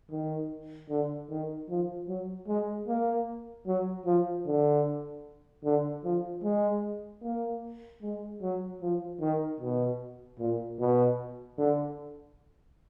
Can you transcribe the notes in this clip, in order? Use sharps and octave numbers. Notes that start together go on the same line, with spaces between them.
D#3
D3
D#3
F3
F#3
G#3
A#3
F#3
F3
D3
D3
F3
G#3
A#3
G#3
F#3
F3
D#3
B2
A#2
B2
D3